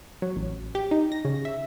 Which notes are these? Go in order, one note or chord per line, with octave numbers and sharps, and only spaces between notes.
F#3
A1
G4
D#4
A#6
C#3
E5